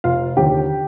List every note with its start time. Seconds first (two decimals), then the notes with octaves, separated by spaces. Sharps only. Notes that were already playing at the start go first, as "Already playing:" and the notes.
0.04 F1 F4 F5
0.37 D#2 D3 F3 G4 G5